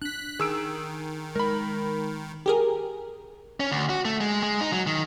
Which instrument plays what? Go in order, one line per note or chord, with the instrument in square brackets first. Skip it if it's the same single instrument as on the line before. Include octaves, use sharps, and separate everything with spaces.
[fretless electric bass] D4 [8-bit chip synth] F#6 B6
[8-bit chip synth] D#3 [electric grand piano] G#4 E6 D7
[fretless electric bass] G#3 [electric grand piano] A#4 B5
[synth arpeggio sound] G4 G#4 A#4
[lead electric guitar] C#4
D2
F#4
A3
G#3
G#3
D#4
F#3
D#3